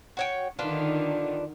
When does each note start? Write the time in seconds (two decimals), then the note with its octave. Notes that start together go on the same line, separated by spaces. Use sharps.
0.17 F#4 C#5 G5
0.59 D3 D#3 D4 F4 B4